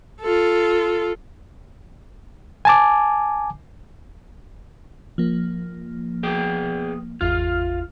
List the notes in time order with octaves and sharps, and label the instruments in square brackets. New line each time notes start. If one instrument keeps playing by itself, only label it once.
[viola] F4 A4
[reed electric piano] G#5 A5 D6
[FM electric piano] F3 A#3
[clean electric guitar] B3 G#4 G5
[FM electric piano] G#1 E2 F6 [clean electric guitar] F4